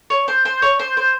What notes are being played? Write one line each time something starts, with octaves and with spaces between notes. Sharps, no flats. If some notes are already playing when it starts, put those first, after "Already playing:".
C#5
C5
C5
C#5
C5
C5